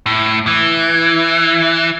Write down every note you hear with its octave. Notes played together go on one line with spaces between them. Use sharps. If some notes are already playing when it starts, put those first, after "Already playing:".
A2
E3